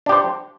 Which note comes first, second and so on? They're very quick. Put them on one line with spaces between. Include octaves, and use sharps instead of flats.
D4 G4 C5